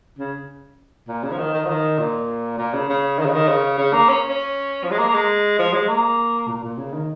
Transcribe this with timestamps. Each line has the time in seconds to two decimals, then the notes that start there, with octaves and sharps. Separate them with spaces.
0.19 C#3
1.08 A#2
1.23 C#3
1.32 F3
1.39 D#3
1.54 D#3
1.65 F3
1.69 D#3
1.99 A#2
2.58 A#2
2.74 C#3
2.89 C#3
3.19 D#3
3.26 C#3
3.33 D#3
3.48 C#3
3.78 C#3
3.93 A#3
4.09 C#4
4.29 C#4
4.83 F3
4.91 G#3
4.98 A#3
5.08 A#3
5.14 G#3
5.59 F3
5.73 G#3
5.88 A#3
6.48 A#2
6.64 A#2
6.78 C#3
6.94 D#3